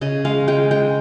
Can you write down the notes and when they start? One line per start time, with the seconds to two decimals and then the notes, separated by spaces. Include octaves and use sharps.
0.01 C#3 D#5
0.25 G#3 F5
0.48 G#3 G5
0.71 G#3 G5